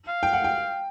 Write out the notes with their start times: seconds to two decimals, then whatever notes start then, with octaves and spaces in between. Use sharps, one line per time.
0.08 F5
0.23 G5
0.33 F#5
0.44 G5